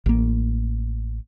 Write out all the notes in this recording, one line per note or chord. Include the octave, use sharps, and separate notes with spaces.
A1 A#3